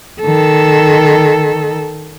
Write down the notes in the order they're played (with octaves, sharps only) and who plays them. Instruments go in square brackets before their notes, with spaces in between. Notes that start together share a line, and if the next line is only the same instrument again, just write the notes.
[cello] D#3 A4